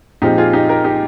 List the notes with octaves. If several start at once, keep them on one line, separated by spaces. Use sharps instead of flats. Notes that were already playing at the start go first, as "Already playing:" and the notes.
A#2 F3 G#3 C4 D#4 G4
F4 G#4
D#4 G4
G4 A#4
D#4 G4